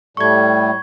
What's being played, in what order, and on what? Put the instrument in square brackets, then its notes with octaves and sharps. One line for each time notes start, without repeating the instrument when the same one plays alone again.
[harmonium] A2 G3 A3 [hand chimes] C#6 G#6